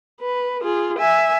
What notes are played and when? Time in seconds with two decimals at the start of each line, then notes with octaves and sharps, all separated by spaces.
0.21 B4
0.62 F4 G#4
0.98 E5 G#5